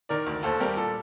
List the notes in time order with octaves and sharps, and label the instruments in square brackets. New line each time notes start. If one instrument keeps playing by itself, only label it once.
[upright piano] D#3 A#4 D5
D2
D#2 A4 C5
G3 G4 A#4
A#2 A4